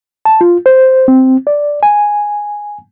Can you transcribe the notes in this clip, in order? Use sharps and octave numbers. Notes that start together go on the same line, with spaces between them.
A5
F4
C5
C4
D5
G#5